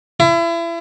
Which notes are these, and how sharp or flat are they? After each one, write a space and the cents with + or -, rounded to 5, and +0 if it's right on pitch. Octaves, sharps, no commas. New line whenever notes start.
E4 +35